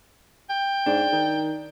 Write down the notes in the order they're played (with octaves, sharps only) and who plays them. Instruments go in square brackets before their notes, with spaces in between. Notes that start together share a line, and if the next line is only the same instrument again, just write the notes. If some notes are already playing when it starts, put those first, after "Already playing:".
[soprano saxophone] G5
[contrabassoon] G#2 [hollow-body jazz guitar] D4
[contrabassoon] D#3